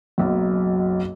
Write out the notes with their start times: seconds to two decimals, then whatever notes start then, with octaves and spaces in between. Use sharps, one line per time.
0.18 F#1 B1 F#2